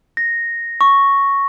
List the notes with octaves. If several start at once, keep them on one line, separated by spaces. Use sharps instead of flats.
A#6
C#6